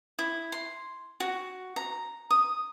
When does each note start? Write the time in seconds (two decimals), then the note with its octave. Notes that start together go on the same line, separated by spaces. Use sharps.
0.19 E4
0.52 C6
1.20 F#4
1.76 A#5
2.31 D#6